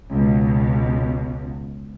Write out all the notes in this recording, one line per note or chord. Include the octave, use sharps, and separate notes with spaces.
C#2 B2